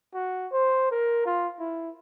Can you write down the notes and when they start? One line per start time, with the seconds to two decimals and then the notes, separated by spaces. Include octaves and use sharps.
0.14 F#4
0.52 C5
0.91 A#4
1.26 F4
1.59 E4